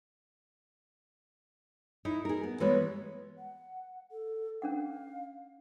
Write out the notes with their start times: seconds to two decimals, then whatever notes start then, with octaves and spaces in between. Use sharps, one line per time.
2.05 D#4 E4
2.25 G#4 A#4
2.43 B3
2.60 E3 G3 G#3 B3 B4 C#5
3.37 F#5
4.11 A4
4.62 C#4 D4 F5 F#5